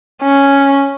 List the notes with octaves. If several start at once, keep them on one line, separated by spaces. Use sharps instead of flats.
C#4